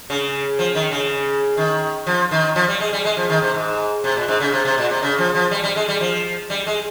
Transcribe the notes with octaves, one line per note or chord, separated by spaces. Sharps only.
C#3
F3
D#3
C#3
D#3
F3
D#3
F3
G3
G#3
G3
G#3
F3
D#3
C3
G#2
C3
A#2
G#2
C#3
C3
C3
A#2
C3
C#3
F3
F3
G3
G3
G#3
G3
F3
G3
G#3